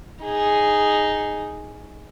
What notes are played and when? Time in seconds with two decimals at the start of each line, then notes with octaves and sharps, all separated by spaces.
0.23 D#4 G#4